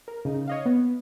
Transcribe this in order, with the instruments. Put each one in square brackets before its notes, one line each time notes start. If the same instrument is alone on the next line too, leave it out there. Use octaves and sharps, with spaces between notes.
[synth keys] A#4
C#3 D#4
C#5 D#5 F5
B3